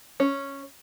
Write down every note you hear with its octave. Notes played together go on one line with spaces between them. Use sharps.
C#4